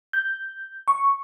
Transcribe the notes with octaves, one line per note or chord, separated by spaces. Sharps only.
G6
C#6